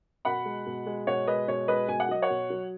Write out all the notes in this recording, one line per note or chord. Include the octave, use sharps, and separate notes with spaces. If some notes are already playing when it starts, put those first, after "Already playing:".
B2 F#5 B5
G#3
B2
G#3
B2 C#5 F#5
G#3 B4 D#5
B2 C#5
G#3 B4 D#5
B2 G#5
F#5
F#3 D#5
C#5 F#5
B2
F#3